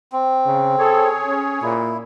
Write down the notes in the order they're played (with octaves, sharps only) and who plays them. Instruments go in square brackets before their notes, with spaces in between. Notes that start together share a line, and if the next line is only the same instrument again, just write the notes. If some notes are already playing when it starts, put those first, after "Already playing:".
[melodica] C4
[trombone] C#3
[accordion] G#4 C#5 [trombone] A4
[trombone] C#4
[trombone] A#2 [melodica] E4